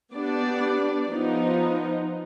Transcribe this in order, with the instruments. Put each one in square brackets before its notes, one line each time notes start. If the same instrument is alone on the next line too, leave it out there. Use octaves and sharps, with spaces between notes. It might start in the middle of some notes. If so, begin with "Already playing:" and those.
[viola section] B3 D4 G4 D5
F3 B3 D#4